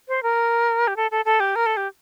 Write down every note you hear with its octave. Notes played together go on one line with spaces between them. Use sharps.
C5
A#4
G4
A4
A4
A4
G4
A#4
A4
G4